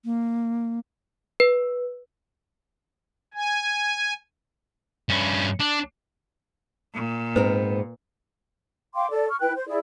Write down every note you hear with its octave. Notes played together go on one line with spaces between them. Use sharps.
A#3
B4
G#5
G2 C#4
D4
A#2
G#2 B3 C4 A#4 B4
F5 G5 C6 D6
A4 D5
C#6 F6
E4 B4 G5 F#6
C5
E4 G#4 D5